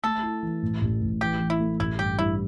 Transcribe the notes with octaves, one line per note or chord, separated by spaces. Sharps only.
A3 A4
E4
E3
A2
A1
A1
E3 G4
E3
E4
A3
A1 E4
G2 G4
G2 E4